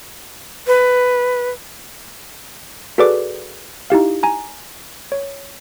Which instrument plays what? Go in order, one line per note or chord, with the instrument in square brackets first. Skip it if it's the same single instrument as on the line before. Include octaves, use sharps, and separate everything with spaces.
[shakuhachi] B4
[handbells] F#4 G#4 A4 B4 D5 D6
D#4 E4 G4 F5
G#5 A#5
C#5